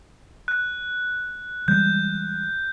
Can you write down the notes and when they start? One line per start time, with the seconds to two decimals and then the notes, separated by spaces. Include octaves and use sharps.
0.48 F#6
1.68 E3 G3 G#3 G6